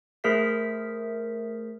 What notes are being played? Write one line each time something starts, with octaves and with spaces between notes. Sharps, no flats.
A3 G#4 A#4 C5 E5 B6